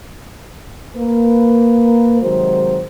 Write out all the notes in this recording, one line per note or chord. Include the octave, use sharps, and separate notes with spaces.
A#3 B4
C3 D#3 F#3 G#3 F#4 C5